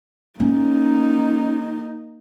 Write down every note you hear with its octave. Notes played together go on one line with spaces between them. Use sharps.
A#3 C#4 D#4